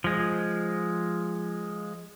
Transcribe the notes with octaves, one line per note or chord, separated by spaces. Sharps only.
F3 G#3